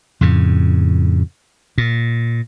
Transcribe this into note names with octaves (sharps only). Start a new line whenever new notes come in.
F2 A2 C#3
A#2